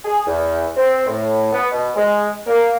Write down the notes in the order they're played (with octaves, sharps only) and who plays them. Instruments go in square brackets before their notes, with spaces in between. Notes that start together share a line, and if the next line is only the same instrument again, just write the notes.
[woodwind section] G#4
E2
C4
A2
B3
B2
G#3
A#3